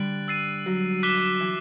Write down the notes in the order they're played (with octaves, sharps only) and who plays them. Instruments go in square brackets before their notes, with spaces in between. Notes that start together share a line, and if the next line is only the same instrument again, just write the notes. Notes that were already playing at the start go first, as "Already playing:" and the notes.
Already playing: [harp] D3 G3 [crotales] F#6 A6 D7 F#7
[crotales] E6 A6 C7 D#7
[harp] F#3
[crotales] D6 F#6 B6 E7 G7
[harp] E3